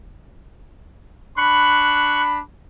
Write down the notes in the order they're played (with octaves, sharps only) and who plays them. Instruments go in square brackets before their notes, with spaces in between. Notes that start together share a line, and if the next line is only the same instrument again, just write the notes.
[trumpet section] D4 B5 [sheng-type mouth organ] C#6 F#6